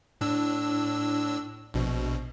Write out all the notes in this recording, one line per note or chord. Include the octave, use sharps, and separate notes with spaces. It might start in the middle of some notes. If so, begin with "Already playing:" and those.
A2 D4 E6
A#1 B2